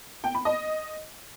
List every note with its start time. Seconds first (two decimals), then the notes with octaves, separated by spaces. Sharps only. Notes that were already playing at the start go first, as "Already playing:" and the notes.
0.24 G5
0.35 B5
0.45 D#5